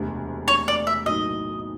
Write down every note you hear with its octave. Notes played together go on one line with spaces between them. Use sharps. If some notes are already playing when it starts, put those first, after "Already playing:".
Already playing: E1 D2 C3
C#5
D5
E5
B1 A2 F#3 A#3 D#4 D#5